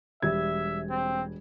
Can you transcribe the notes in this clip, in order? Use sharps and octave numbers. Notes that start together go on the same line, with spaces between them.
E1 G3 E5 G#6
C4